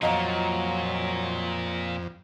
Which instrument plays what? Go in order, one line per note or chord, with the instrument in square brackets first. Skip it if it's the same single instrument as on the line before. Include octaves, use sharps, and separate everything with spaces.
[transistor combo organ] F2 [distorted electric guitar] A#2 [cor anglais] F#3 [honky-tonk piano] D#5 F5 A#5